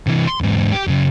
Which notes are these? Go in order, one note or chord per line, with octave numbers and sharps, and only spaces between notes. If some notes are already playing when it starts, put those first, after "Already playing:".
C3 E3
C6
E2 G#2
G4
F#2 C#3